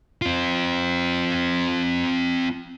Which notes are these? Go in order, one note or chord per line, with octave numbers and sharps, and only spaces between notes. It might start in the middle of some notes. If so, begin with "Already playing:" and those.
C4 F4